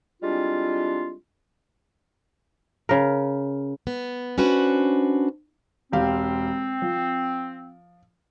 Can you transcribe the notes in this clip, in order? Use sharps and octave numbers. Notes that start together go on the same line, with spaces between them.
G3 G#3 C4 D4 E4 F4
C#3 A#4
B3
C#4 D4 F#4 B4 C5 F#5
E1 C4 G4 F5
F3